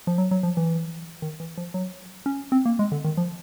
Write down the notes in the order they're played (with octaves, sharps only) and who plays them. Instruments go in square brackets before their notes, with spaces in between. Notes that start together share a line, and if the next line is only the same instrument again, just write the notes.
[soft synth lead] F3
F#3
F#3
F3
E3
D#3
E3
F3
F#3
C#4
C4
A#3
G#3
D3
D#3
F3